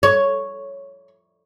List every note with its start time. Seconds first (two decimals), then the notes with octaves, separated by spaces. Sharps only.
0.03 C#5